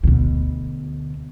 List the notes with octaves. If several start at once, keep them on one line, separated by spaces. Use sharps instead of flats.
D2 B2